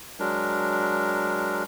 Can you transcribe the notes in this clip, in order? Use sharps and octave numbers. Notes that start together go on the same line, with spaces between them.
F#3 G#3 D4 A#4